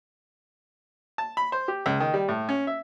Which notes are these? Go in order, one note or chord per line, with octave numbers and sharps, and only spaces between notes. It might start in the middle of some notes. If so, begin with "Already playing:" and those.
A5
B5
C5
G4
C#2
D#3
G3
A2
C#4
E5